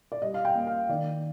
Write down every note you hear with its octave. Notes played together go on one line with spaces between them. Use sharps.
D5
G3 D#5
F5
G5
A#3
F5
D#3 D5